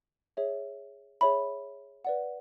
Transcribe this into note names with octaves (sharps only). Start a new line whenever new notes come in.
G#4 C#5 E5
G#4 C#5 E5 B5
B4 D5 F#5